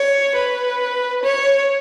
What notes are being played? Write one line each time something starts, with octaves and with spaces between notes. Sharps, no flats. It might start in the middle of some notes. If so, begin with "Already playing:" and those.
Already playing: C#5
B4
C#5